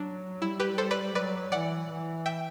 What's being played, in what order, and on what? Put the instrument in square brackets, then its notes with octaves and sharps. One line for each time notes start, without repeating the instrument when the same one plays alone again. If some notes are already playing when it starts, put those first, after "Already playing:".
Already playing: [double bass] F#3 [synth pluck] D4
[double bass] G3 [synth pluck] E4
[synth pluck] G4 B4
A4 C5
B4 D5
[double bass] F#3 [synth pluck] B4 D5
[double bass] E3 [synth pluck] D5 F#5
[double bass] E3
[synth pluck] E5 G5